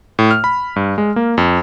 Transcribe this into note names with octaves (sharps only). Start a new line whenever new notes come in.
A2
F6
B5
G2
G#3
A#3
F2